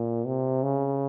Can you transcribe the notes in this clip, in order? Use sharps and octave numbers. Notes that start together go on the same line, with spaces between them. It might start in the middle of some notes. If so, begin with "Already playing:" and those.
Already playing: A#2
C3
C#3